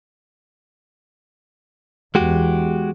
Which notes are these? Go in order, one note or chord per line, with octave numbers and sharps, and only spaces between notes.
E2 G#3 F#4 G4